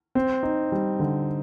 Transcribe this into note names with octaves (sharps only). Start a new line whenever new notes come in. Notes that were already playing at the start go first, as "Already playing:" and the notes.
C4
D#4
G3
D3